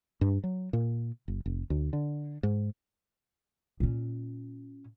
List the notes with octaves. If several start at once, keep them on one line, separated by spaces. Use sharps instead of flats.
G2
F#3
A#2
F#1
F1
D2
D3
G#2
A#2 C#4